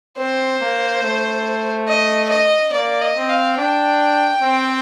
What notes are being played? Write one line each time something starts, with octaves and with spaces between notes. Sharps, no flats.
C4 C5
A#3
A3
D#5
D#5
A#3 D5
D#5
C4
F5
D4 G5
C4